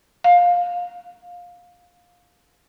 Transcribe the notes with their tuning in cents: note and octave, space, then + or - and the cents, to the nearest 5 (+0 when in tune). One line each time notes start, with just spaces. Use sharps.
F5 +20